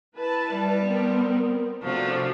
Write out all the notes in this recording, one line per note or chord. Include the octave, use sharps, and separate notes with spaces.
E4 B4 A5
G3
B3 C4 A#4
C3 F3 A3 D4 F#4